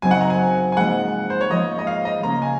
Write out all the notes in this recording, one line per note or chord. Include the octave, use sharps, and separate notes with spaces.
F#2 C#3 F#3 C4 D#4 G#5
F#5
A#5
G#5
G#5
G#2 F3 A#3 D#4 F#5
C5
C#5
G#2 F3 G#3 C#4 D#5
D#5
F5
D#5
C#3 F3 A#3 C#4 A#5
G#5